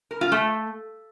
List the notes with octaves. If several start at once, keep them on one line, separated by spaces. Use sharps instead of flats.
A#4
F4
A3